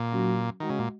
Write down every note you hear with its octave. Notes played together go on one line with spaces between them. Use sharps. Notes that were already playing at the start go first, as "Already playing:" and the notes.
Already playing: A#2
F#3 C#4 F#4
D#3 G#3 F#4 D#5 F#5
C#3
A#2